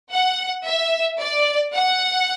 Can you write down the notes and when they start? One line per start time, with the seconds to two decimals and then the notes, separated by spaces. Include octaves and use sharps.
0.10 F#5
0.64 E5
1.18 D5
1.72 F#5